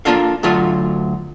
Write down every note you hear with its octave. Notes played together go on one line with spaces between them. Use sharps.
A#3 C4 D4 F4 A4 F5
D2 F#3 A3 F4